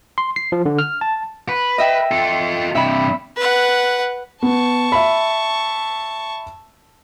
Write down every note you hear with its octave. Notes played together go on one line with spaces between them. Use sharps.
C6
C7
F3
D3
F6
A5
B4
D#5 E5 G5
F4 A4
G2 C3 E5 B5
B4 F#5
B3 A5 C#6
E5 B5